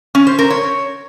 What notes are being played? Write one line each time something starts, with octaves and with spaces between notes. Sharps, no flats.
C#4
C5
A#4
C#5